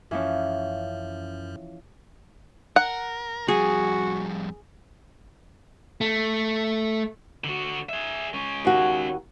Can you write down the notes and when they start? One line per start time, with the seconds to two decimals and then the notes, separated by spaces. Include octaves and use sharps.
0.11 F#2 E3 F3 C#4
2.76 A#4 F#5
3.48 F2 G3 F#4 G#4
6.01 A3
7.44 D3 F#4
7.89 G#4 E5
8.33 G#3 C#4
8.65 D#2 F#4